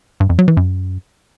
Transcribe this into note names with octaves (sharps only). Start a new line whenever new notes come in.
G2
F2
F#3
E3
F#2